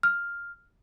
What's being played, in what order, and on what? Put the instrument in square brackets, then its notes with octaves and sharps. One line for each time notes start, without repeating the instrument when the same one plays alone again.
[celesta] F6